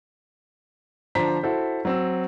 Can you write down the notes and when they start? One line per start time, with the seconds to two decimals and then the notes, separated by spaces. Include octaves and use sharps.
1.15 D3 F3 D4 C5 A#5 B6
1.43 E4 F#4 A4 C5
1.85 F#3 C4 E6